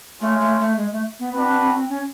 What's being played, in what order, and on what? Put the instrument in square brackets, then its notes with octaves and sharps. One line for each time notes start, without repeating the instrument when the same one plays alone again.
[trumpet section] G#3 C#4 F4 [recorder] A3
[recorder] A3
A3
G#3
A3
B3
[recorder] C4 [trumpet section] D4 F#4 B4
[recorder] C4
C4
C4
C#4